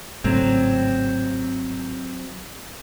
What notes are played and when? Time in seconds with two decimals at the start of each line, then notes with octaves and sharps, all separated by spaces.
0.24 G#1 A2 C#3 F#3 C4